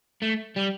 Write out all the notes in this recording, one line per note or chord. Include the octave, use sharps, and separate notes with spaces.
A3
G3